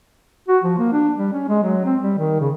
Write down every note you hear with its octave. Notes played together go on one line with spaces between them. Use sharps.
F#4
F3
A#3
D4
G3
C#4
G#3
F#3
C4
G3
D#3
C#3